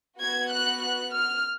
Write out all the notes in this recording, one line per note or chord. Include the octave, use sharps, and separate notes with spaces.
B3 F#4 G#6
F#6
F#6
F6